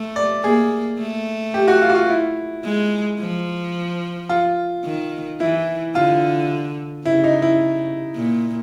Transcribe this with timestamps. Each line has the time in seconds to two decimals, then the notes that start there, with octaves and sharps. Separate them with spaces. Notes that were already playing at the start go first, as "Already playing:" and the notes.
Already playing: A3
0.16 D5
0.44 A#3 G#4
0.99 A3
1.54 G4
1.68 F#4
1.82 F4
1.90 F#4
1.95 F4
2.10 E4
2.64 G#3
3.20 F3
4.29 F4
4.85 D#3
5.40 E3 E4
5.95 D3 F4
7.05 C#3 E4
7.24 D#4
7.42 E4
8.15 A#2